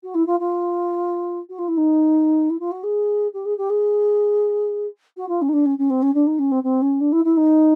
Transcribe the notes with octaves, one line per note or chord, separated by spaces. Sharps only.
F#4
E4
F4
F4
F#4
F4
E4
D#4
E4
F4
F#4
G#4
G4
G#4
G4
G#4
F#4
F4
C#4
D#4
D4
C#4
C#4
C4
C#4
D4
D#4
C#4
C4
C4
C#4
D4
E4
E4
D#4